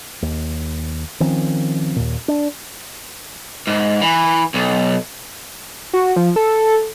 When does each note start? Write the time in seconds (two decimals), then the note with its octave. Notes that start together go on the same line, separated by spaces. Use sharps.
0.22 D#2
1.20 D#3 F3 C4 C#4
1.96 D#2 A#2
2.28 D4
3.67 G#2
4.02 E3
4.54 B1
5.93 F#4
6.16 F3
6.36 A4